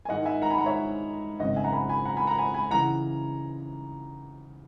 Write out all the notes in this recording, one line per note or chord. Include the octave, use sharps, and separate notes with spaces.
G#5
G#2 D#3 G#3 D#4 D#5 F#5
E5 G#5
F#5 A#5
G#5 B5
F#5 A#5
C#5 E5
G#1 F#2 C#3 D#5 F#5
E5 G#5
F#5 A#5
G#5 B5
G#5 B5
F#5 A#5
G#5 B5
F#5 A#5
G#5 B5
G#5 B5
C#3 E3 F#5 A#5